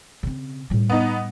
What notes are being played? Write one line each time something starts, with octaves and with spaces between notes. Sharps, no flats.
C#3 C4
A2 G3
B3 D#4